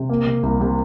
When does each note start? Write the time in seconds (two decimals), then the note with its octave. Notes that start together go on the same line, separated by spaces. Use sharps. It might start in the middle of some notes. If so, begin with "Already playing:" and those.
Already playing: C3
0.10 A#3
0.27 C3
0.43 C2
0.61 C3